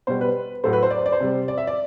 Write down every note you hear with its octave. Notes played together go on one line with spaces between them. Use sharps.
B2 G3 C5
B4
A2 F#3 A3 C5
B4
C5
D5
C5
D5
C5
C3 G3
D5
E5
D5